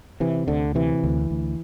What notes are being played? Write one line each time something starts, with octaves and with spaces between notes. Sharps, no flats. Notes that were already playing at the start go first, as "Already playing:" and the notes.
C3 E3
D2 D3
C3 E3
D2
D2